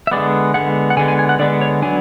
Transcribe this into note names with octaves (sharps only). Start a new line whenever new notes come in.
E5
D3 G#3 B3 D5
D3 G#3 B3 F#5
F#5
D3 G#3 B3 G#5
G#5
G#5
F#5
D3 G#3 B3 D5
C#5
F#3 B3 D4 G#5